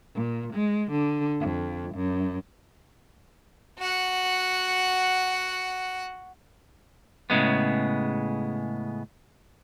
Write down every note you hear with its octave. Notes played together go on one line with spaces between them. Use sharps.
A#2
G#3
D3
F2
F#2
F#4 F#5
A2 C#3 G#3 B3